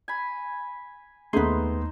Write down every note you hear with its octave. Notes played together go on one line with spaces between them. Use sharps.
G#5 B5
D#2 A3 B3 D#4 G#4 B4 C5 C6